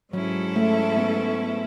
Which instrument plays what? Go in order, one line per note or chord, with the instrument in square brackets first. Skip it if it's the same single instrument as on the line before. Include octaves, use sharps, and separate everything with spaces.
[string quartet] G#2 G#3 C#4 E4 A4 [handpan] F#3
[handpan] A3
B3